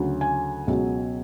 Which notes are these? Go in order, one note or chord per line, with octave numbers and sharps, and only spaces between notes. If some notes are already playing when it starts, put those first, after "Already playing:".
Already playing: D2 C#3 F#3
G#5
C#2 B2 F#3